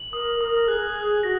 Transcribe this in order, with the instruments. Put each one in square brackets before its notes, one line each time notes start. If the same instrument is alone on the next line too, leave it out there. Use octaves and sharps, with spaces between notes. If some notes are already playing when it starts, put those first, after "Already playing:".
Already playing: [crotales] F#7
[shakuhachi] A#4 [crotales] D#6
[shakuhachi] A#4 [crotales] D#6
[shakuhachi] G#4 [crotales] F#6
[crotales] F#6
[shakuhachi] F#4 [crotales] A#6